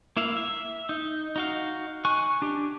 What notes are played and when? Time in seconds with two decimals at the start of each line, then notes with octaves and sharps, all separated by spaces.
0.17 A#3 E4 E5 F5
0.37 E5
0.89 D#4
1.36 D#4 F#4 F5
2.05 G#5 C#6 F#6
2.42 D4 G4